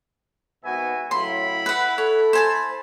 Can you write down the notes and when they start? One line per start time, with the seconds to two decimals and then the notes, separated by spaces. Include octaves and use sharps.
0.64 G#1 B3 F#4 E5 G#5
1.11 A2 C#3 F#3 E4 B5 C6
1.66 B4 F#5
1.98 A4 C#5
2.33 C5 G#5 A5